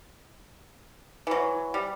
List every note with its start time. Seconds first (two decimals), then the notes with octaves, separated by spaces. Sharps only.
1.27 E3 F#3
1.74 G3